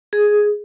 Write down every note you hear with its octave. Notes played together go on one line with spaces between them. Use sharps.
G#4